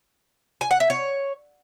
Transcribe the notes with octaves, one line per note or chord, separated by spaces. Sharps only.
G#5
F#5
E5
C#5